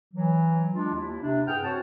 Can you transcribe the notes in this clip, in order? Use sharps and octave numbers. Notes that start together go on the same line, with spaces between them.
E3 F#3
G#3 D4 F4
D#2 E4
C3 D4
G2 E4 G#4 F#5 G5 F6
C4 F#4 C#5 F#5 A5